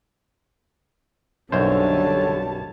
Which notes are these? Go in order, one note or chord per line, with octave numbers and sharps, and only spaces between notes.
B1 F#2 D3 G3 C5 C#5 A5